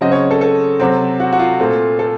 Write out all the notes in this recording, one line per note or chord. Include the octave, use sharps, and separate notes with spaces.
C#3 F#3 C4 D#5
C#5
A4
A4
C3 F#3 C4
F#4
F#4
F4
A#2 A3 C4
A4